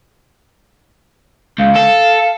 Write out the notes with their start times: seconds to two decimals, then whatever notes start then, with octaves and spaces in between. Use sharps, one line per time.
1.59 C#2 F5
1.76 A4